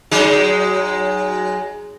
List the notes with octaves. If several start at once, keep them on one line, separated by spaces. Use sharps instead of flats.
F#3 G#3 D#4